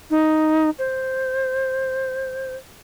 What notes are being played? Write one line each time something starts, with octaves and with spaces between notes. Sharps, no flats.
D#4
C5